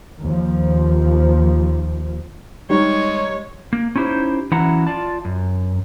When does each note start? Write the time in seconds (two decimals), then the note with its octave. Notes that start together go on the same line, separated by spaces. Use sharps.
0.22 D#2 F3
2.70 G3 G#3 D#4 C#5
3.73 A#3
3.96 C#4 D#4 E4 G4 C5
4.51 E3 F#3 C#4 E4 F#5 A#5
4.87 F4 D5 A5
5.25 F#2